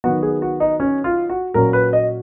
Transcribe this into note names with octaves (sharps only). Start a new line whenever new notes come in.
D#3 F#3 B3 F#4
G#4
F#4
D#4
C#4
F4
F#4
A#2 F#3 C#4 A#4
B4
D#5